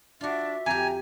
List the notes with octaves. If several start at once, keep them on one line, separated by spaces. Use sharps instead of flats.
D4 F4 F#4 E5
F2 G4 G#5 A#5